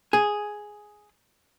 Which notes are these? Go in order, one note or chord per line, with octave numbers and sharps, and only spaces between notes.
G#4